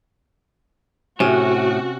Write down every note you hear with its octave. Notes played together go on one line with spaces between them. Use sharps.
A2 C3 C#4 F#4